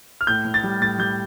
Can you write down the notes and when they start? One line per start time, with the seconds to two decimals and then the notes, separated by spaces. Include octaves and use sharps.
0.21 F6
0.27 A2 G6
0.45 A2
0.54 A6
0.63 G3
0.81 A2 A6
0.99 G3 G6